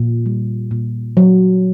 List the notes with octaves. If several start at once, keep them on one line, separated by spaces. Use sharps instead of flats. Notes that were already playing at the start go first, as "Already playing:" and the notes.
Already playing: A#2
G3
A#2
F#3